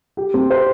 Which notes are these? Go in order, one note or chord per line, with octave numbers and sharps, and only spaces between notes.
G4
C4
C5